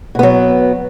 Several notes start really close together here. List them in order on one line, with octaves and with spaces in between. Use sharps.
B2 B3 F#3